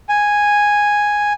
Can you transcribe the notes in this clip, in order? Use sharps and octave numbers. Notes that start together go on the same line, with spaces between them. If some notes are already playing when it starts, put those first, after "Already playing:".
G#5